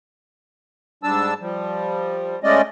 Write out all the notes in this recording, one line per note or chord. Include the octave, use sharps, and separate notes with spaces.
G#2 G3 D4 A5 E6
F3 G3
G#3 A3 C#4 D5 D#5